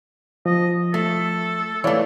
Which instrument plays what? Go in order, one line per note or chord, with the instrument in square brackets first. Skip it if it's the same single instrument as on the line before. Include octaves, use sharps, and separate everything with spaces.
[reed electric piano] F3 [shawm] D#5
[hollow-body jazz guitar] A3 [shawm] A4
[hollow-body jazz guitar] E3 A3 [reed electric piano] C#5 D5 F5